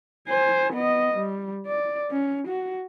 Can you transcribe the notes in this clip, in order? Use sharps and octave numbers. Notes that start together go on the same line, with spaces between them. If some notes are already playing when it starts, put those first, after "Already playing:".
C5 G#5
B3 D#5
G3
D5
C#4
F#4